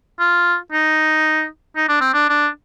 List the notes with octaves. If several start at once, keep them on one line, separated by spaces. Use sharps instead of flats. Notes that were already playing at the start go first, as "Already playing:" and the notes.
F4
D#4
D#4
D4
C4
D4
D4